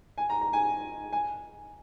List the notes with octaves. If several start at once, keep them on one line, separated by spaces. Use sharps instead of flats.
G#5
A#5
A#5
G#5
G#5